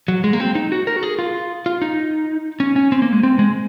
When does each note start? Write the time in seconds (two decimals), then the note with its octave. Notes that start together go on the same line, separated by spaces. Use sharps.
0.08 F#3
0.24 G#3
0.33 A#3
0.40 C4
0.55 D#4
0.72 F#4
0.87 A#4
0.96 F#4
1.03 G#4
1.19 F4
1.66 F4
1.82 D#4
2.60 C#4
2.76 C#4
2.92 C4
3.02 A#3
3.13 G#3
3.23 C4
3.39 G#3